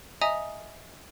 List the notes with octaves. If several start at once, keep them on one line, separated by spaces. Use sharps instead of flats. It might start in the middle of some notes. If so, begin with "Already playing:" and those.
D#5 E5 G#5 A#5 D#6